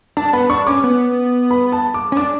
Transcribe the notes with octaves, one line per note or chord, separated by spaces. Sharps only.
D4 A5
B3 B5
D4 C#6
C#4 D6
B3
B5
A5
D6
C#4
D4 D6